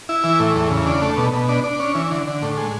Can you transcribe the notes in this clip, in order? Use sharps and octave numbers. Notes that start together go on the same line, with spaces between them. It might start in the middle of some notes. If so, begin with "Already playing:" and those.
E4
E3
A2
E2
C#3
D4
A3
B2
B2
D4
D4
C#4
E3
D3
D3
A2
G#3